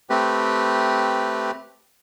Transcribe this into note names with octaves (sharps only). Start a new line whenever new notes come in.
A3 C4 G4 B4